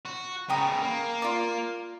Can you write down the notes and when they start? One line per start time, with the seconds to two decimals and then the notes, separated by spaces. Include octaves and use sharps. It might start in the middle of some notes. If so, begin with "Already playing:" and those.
0.05 F#4
0.49 C#3 B3 G5 A#5 D#6
0.82 A#3
1.22 F4 D5